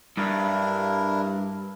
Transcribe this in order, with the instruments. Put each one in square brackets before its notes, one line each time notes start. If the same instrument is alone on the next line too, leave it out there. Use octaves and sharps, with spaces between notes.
[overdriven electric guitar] G2 [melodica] D4 E4 A#4